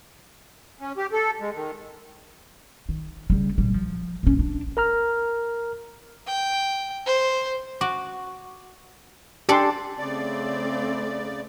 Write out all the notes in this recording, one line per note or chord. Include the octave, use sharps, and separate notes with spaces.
C#4
G4
A4
G#3
D#3
D#3
C#3 G3
A#2 G3
F3
A#1 C#4
D4
A#4 A#5 F6
G5
C5
F#4 D6
D4 G4 A4 D5 C6
C#3 A3 C4 D5